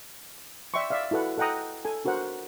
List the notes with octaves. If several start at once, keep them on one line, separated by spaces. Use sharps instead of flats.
D5 E5 G5 C6 C#6
D5 E5 F5
E4 F#4 A4 B4 F#5
A4 D#5 F#5 G5 A#5 D#6
A4 G#5
D4 F#4 A#4 C5 F#5